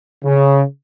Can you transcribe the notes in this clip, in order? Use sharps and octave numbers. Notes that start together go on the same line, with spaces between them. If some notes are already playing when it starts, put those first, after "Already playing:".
C#3